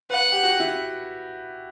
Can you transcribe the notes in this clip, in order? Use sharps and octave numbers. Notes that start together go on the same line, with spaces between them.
B4 F#5
G4
F#4
E4